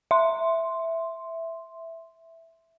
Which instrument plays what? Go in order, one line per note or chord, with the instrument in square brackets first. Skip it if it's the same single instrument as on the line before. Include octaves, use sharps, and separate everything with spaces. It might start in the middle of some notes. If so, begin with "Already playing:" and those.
[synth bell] E5 C6